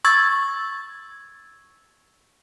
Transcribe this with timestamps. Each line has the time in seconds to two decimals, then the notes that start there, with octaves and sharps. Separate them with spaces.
0.05 C#6 E6 G#6 A6